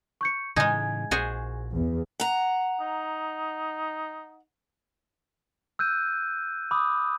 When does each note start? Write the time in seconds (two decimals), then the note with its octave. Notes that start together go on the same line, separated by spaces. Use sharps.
0.21 C#6 G6 C#7
0.56 A2 C#3 E3 G#3 D#4 G#5 G#6
1.11 A#1 F#4 G#4 C5
1.73 E2
2.20 F#5 A#5
2.81 D#4
5.79 E6 F#6 G6 D#7
6.71 B5 D6 D#6